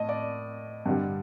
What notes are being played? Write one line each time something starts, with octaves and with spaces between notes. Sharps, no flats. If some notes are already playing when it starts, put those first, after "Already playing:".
Already playing: A2 D#5 A5
D5
G2 D3 G3